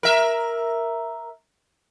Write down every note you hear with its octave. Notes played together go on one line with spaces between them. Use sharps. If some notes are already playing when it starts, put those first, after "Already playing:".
A#4 E5